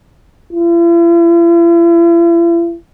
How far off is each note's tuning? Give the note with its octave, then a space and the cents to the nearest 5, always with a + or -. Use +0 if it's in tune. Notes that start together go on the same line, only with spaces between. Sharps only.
E4 +45